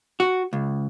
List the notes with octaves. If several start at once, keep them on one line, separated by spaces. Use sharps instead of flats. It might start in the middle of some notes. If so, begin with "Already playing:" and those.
F#4
C#2